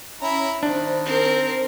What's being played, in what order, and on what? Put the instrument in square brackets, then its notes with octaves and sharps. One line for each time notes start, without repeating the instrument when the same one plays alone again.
[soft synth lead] C#4 [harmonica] E4 A#5 B5
[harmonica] D#3 [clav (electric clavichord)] D4 [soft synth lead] C5
[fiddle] C4 A#4